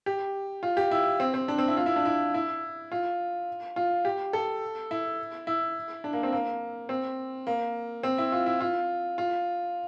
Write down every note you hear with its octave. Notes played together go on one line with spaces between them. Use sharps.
G4
F4
G4
E4
C4
C4
D4
C4
E4
F4
E4
D4
E4
E4
F4
F4
G4
A4
E4
E4
D4
A#3
C4
A#3
C4
A#3
C4
E4
F4
E4
F4
F4